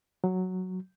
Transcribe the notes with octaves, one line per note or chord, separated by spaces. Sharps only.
F#3